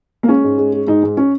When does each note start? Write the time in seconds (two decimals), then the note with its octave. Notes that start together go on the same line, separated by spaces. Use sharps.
0.23 A#3
0.28 G#3 C#4
0.44 G#2
0.58 G#3
0.73 G#3
0.87 G#2 D#4
1.03 G#2
1.17 C#4